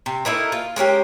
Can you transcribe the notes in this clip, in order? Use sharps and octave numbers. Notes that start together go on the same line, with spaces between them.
C3
A3 A#3 D#4 E4
F4
G#3 A#3 C#4 G4